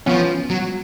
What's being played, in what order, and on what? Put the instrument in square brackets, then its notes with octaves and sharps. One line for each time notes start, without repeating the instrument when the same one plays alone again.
[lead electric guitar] F3 [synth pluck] B3 C#4
[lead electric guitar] F#3